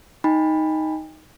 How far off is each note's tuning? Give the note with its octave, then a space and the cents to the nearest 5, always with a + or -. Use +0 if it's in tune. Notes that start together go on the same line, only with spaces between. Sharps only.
D#4 +5 G5 +40 B5 +0